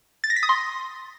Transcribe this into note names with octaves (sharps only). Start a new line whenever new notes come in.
A6
A#6
B6
D#6
C6